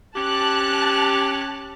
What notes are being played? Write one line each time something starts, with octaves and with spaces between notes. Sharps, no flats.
C#4 G4 A5 F#6